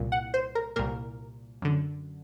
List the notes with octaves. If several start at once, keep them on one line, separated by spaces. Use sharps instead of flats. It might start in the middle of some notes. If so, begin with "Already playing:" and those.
Already playing: C2 A#2
F#5
C5
A#4
C2 A#2 A#4
F#2 D3